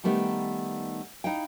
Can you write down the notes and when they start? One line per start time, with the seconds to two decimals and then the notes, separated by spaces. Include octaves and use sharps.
0.04 D#3 G3 A3 B3 D#4 G4
1.24 D#4 E4 D#5 F5 G5